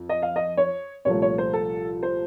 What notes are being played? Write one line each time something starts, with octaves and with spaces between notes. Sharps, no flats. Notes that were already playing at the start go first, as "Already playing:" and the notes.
Already playing: F2
D#5
F5
D#5
C#5
C2 A#2 F3 A3 C#5
C#5
C5
A4
C5